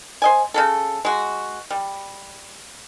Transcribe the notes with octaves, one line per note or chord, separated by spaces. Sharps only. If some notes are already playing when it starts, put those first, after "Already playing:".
C5 D#5 G#5
C#3 F#3 A4
G#3 F#4
G3